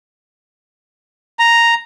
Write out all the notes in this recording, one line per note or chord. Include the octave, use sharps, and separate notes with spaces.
A#5